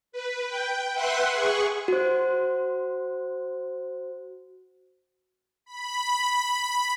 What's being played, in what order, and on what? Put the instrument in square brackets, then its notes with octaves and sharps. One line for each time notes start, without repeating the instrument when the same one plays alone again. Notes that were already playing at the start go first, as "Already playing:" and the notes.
[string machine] B4
G5
B4 E5 F#5 C6 F#6
G#4 C#6
[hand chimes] F#4 C5
[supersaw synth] B5